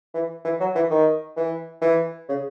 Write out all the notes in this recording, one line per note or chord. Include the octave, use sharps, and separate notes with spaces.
E3
E3
F#3
E3
D#3
E3
E3
C#3